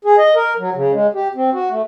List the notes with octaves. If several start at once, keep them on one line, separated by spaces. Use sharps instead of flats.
G#4
D#5
A#4
F#3
C#3
G#3
G4
C4
F#4
A3